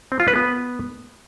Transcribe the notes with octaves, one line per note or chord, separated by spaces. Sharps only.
C4
F4
B4
B3